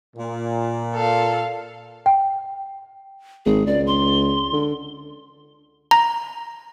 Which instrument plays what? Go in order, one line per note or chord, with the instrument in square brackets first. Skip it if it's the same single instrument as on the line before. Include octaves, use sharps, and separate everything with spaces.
[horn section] A#2
[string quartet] A4 F5
[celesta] G5
[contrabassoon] G#1 [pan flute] G#4
[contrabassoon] C#2 [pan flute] D5
[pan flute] C6
[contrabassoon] D3
[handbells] A#5